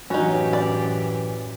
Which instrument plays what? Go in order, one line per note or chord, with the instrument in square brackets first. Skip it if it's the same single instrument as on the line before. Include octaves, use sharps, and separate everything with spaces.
[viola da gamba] F#2 A2 G4 [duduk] E3 [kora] C#4 F#4 [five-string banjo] D#4 C#5
[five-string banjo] D5